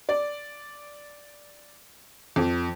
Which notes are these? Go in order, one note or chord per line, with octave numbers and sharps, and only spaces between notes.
D5
F2